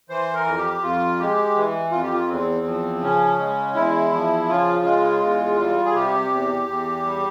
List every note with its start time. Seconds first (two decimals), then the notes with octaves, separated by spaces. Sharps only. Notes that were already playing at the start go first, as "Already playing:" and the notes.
0.09 E3 C5
0.34 A#4
0.45 F2
0.58 G4
0.82 F2 F4
1.19 G#3 G4
1.56 E3
1.92 F2 F4
2.02 G4
2.13 F4
2.29 E2 C4
2.65 F3
3.02 C#3 C#4
3.39 G#3
3.75 E2 E4
4.11 F3
4.49 C#3 F4
4.85 G#3
5.22 E2
5.58 G3
5.86 G#4
5.94 C3 G4
6.31 E2
6.68 E2
7.05 G3